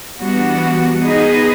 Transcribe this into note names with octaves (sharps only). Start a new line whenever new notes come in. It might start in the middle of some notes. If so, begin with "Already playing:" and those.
E3 G3 B3 D4 F#4
B3 D#4 G#4 B4 D#5